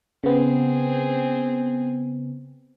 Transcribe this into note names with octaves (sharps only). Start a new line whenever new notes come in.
C#3 B3 C4 G#4